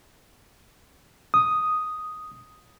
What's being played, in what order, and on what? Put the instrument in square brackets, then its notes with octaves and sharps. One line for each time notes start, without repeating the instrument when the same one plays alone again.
[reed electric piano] D#6